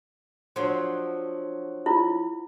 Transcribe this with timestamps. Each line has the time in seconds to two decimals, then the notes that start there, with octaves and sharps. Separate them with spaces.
0.56 F3 F#3 D4
1.86 E4 F4